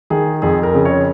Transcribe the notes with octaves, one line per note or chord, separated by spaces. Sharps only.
D#3 G#4
F2 G#4
A#4
C#3
C#5